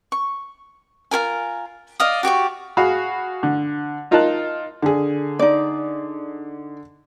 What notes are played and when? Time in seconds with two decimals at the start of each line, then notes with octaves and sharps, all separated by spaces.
0.12 C#6
1.11 F4 G#4 A#4 G#5
2.00 D5 D#5 F5 D#6
2.23 F#4 G4 D5 C#6
2.77 F#4 G#4 F5 B5
3.43 D3
4.11 D#4 F4 A#4 D#5 A5 F#6
4.82 D3 G#4
5.39 D#4 D5